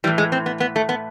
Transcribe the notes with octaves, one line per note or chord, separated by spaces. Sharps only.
A2 E3 G3
G#3
C4
B3
B3
A3
B3